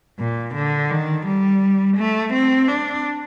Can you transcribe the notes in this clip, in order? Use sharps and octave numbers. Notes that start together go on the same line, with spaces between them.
A#2
D3
D#3
G3
A3
C4
D4